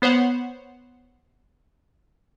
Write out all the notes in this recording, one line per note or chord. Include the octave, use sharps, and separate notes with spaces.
B3 C5 C#5 F#5